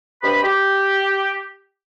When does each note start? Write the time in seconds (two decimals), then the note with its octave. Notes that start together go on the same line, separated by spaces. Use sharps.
0.22 G2 C3 C5 D#5 B5
0.43 G4